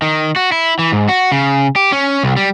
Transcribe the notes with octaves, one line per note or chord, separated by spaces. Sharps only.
D#3
F#4
E4
E3
G#2
F#4
C#3
G4
C#4
C2
G3